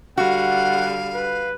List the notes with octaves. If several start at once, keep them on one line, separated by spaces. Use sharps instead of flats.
D3 G3 F#4 F5 F#5
B4